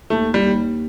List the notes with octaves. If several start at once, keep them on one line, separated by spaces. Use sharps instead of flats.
D#2 A3
G3
D#2